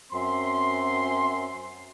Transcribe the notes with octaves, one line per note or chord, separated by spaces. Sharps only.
F#2 C4 E5 C6